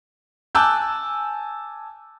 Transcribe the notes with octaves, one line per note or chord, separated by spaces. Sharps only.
G#5 A5 D6 E6 F#6 G6